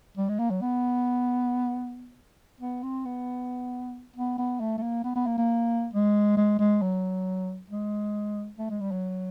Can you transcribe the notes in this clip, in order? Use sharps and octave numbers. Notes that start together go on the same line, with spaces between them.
G3
G#3
A#3
F#3
B3
B3
C4
B3
B3
B3
A3
A3
A#3
B3
B3
A#3
A#3
G#3
G#3
G#3
F#3
G#3
A3
G#3
G3
F#3